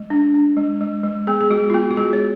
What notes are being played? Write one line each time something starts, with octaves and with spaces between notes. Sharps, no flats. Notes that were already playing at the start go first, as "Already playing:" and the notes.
Already playing: G#3
D4
D4
G#3
G#3
G#3
B3 G#4
G#4
G#3 F#4
F4
B3 F#4
F#4
G#3 G#4
C#5